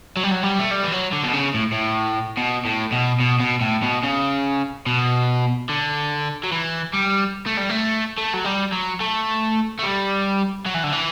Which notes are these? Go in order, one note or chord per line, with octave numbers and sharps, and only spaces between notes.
F#3
G3
F#3
G3
A3
G3
E3
F#3
D3
B2
C#3
A2
A2
B2
A2
B2
B2
B2
A2
B2
C#3
B2
D3
F#3
E3
G3
A3
G3
A3
A3
F#3
G3
F#3
A3
A3
G3
F#3
E3
D3
E3